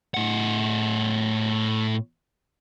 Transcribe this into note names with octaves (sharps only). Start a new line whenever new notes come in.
A2 F#5